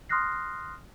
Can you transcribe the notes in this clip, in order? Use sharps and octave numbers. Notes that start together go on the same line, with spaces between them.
C6 D#6 F6 F#6 A#6 C7